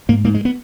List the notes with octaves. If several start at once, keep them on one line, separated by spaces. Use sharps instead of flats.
G#2 A#3
G#2 A#3
G#3
B3